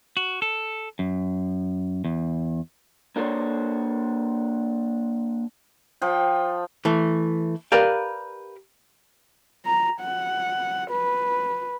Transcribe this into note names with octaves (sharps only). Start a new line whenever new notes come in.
F#4
A4
F#2
E2
A#3 D4 A4 C5 C#5
F3 G5
E3 A3
G4 A#4 B4 D5 F5
A#5
F#5
B4